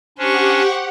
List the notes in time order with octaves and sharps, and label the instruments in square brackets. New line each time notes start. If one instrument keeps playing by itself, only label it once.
[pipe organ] C#4 D4 [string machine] G4 F#5 [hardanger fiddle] C5 C#6